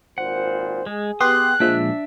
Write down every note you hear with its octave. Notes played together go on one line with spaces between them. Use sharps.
G#1 A#2 C5 F#5
G#3 G#4
B3 G4 C6 D#6 F#6
A#2 F3 G#3 D4 E5